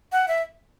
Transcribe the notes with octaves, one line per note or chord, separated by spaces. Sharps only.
F#5
E5